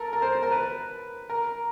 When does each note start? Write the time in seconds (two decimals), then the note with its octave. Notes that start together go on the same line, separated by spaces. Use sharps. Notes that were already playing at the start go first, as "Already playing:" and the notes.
Already playing: A4 A#4
0.13 A#4
0.22 C5
0.32 C5
0.43 A#4
0.52 B4
1.30 A#4